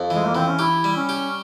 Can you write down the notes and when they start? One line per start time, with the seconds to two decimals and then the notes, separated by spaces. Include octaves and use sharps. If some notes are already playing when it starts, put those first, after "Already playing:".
Already playing: F2
0.10 E3 G#3
0.26 A#3
0.35 E3 C4
0.48 C#4
0.59 E4 G4
0.84 G3
0.96 C#4
1.09 G4